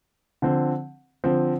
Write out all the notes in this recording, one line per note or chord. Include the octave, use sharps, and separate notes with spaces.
D3 F3 C4
D3 F3 C4